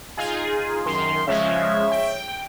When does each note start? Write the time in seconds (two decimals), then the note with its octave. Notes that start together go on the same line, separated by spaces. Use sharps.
0.17 D#4 F4 G#4
0.86 F#2 D#3 C6
1.27 C#3 F3 G#3 C#5 E5
1.92 G5